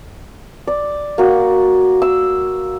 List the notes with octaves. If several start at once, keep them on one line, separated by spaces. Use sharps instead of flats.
D5
A#3 F#4
E6